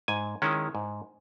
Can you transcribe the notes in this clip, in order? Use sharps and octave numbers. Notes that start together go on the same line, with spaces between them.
G#2 G#5
D#3 G#3 C#4 E4
G#2